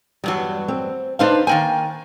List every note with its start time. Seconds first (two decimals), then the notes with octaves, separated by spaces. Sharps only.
0.24 E2 G2 F#3 G3
0.68 C4
1.19 D4 D#4 B4 C5 F5 A5
1.47 D#3 A#3 G5 G#5